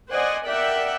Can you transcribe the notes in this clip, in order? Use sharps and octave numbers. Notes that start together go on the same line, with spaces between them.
C5 D5 D#5 F#5 G#5
A#4 D5 E5 F#5 G5